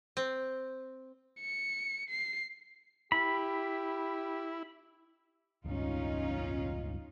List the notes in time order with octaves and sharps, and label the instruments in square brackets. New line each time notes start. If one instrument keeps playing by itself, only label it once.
[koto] C4
[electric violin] C#7
C7
[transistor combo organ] E4 [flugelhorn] G4 [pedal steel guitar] B5
[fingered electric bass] E1 C#2 G2 [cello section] C#4 D#4 F4